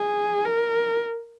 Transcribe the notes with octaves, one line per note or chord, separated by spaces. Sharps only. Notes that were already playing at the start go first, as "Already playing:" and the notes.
Already playing: G#4
A#4